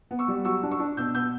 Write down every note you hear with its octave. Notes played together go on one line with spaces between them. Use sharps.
B3
C#6 E6
G3
F#3 C#6 E6
D4
C#6 E6
D4
B2 E6 G6
B3 E6 G6